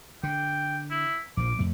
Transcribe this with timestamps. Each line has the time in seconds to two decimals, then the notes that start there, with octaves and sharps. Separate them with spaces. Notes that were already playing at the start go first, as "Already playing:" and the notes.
0.23 D3 G5
0.90 E4
1.37 A#1 F3 D6
1.59 F2 A3